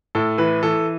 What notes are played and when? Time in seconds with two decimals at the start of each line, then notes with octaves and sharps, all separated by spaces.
0.15 A2 A4
0.38 E3 B4
0.63 E3 A4